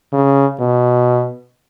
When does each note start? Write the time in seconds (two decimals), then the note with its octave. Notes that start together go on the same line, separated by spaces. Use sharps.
0.13 C#3
0.60 B2